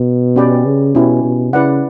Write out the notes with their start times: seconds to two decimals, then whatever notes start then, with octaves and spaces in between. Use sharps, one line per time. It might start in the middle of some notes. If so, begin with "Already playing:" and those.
Already playing: B2
0.36 C#4 G4 B4 D5 G5
0.65 C#3
0.95 B2 C#4 E4 G4
1.24 B2
1.53 C#3 E4 B4 D5 F#5